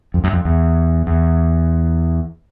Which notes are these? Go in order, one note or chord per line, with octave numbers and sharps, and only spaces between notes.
F2
F#2
F2
E2
E2